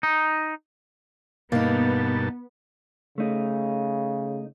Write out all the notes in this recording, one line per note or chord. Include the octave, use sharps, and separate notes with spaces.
D#4
G2 B2 A#3 B3 D#4 A5
C#3 A3 D#4